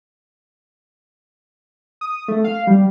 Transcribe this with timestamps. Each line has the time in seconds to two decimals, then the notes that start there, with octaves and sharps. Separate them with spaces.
2.01 D#6
2.28 A3
2.44 F5
2.67 G3